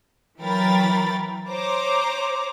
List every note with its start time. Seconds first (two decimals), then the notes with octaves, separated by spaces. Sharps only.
0.40 E3 F#3 A#4 G5 B5 A6
1.50 C5 C#5 A#5 D6